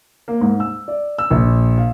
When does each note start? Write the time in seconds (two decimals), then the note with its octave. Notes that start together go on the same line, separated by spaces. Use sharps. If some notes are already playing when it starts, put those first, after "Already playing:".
0.28 A#3
0.41 G#2
0.60 E6
0.88 D5
1.18 E6
1.30 A#1
1.78 F5